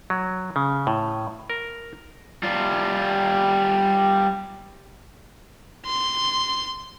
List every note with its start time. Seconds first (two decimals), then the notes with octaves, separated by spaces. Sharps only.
0.10 F#3
0.56 C#3
0.87 A2
1.50 A#4
2.43 G3 F4
5.86 C6